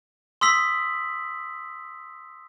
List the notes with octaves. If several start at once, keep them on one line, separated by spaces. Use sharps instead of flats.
C6 D#6 E6 B6 F#7